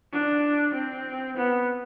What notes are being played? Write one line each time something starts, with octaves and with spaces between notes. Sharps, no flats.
D4
C4
B3